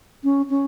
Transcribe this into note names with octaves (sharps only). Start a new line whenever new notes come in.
C#4
C#4